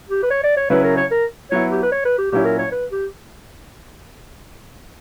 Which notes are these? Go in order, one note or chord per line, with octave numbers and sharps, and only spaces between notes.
G4
B4
C#5
D5
C#5
C#3 F#3 C#4 E4 B4
A#4
C#5
A#4
F#3 B3 E4 C#5
G4
B4
C#5
B4
G4
A#2 F#3 C#4 E4 G4
A#4
C#5
B4
G4